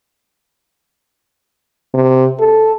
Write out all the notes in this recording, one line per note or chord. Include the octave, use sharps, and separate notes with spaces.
C3
A4